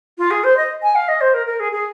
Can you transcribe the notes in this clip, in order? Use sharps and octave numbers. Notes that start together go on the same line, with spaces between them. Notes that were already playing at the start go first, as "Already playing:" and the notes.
F4
G#4
C5
D#5
G#5
F5
D#5
C5
A#4
A#4
G#4
G#4